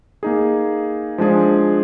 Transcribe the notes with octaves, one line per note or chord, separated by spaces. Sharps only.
A#3 D#4 G#4
F3 G#3 D4 G#4